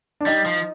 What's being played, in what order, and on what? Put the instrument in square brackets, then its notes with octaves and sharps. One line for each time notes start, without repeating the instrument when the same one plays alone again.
[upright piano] D4
[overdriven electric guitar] G3 [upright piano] D#4
[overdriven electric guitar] F3